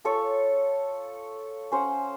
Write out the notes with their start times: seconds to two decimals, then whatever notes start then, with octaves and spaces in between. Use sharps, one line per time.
0.05 F4 A4 C#5 C#6
1.72 C#4 C5 F5 F#5